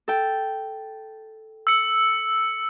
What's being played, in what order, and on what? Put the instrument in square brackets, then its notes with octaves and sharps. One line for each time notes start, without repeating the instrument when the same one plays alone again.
[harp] A4 G5
[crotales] E6 C#7